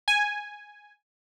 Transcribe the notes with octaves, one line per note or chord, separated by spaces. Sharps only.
G#5